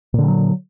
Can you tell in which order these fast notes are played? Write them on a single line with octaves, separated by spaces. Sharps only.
A#2 D3 G3 F#3